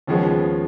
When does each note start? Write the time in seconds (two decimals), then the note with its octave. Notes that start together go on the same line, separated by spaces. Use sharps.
0.07 D#2 C#3 F3 G#3 B3